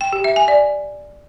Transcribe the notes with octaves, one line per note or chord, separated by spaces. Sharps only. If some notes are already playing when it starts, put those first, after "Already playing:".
G5
G4
E5
G#5
D5